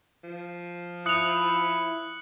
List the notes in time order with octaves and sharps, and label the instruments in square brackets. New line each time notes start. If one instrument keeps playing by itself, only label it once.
[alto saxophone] F3
[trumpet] E4 [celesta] D#6 F7 [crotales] F#6 C#7 F#7